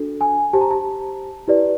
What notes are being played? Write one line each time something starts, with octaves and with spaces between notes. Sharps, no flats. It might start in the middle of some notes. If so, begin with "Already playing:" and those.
Already playing: D4 F#4 A4
G#5
G4 C5 A5
A#5
A5
E4 G4 B4 D5